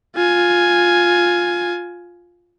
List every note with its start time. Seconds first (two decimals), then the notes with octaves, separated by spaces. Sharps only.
0.16 F4 G#5